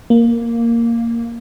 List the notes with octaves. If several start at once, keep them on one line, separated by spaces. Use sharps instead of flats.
A#3